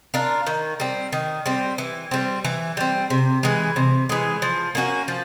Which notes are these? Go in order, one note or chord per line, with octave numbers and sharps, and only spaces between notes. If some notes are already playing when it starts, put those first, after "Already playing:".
D4 F4 A#4
D#3
G3 C4
D#3
G3 C4
E3
G3 C4
E3
G3 C4
C3
E3 G#3
C3
E3 G#3
F3
A#3 C#4 F#4
F3